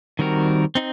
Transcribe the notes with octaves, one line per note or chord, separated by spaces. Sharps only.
D#3 G3 C4 F#4 A#4
C4 D#4